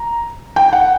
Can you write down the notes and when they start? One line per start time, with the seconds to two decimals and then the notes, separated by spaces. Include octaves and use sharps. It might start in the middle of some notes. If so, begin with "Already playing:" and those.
Already playing: A#5
0.56 G5
0.73 F#5